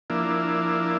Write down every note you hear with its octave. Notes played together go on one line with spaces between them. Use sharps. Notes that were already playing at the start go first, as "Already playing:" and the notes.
F3 A#3 D4 E4